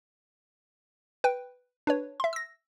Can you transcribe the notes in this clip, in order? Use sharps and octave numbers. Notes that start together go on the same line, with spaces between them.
B4 G5
D4 B4 C#5
E5 C6
E6 A#6